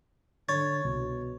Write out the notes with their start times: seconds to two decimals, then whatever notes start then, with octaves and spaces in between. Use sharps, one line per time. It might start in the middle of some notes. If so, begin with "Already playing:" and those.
0.49 D3 C#5 A6
0.85 C2 B2